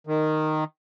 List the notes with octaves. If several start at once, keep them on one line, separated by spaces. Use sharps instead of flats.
D#3